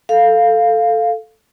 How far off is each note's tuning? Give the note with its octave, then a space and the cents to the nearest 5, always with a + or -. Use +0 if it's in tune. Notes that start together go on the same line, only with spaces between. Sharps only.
A4 +0 F5 +0